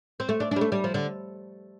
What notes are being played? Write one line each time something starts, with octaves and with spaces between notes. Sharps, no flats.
C4
A3
D4
G3 D4
A3
G3
F3
D3